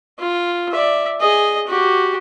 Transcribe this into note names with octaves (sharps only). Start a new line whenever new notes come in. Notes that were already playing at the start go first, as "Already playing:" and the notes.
F4
D5 E5
G#4 D#5
F#4 G4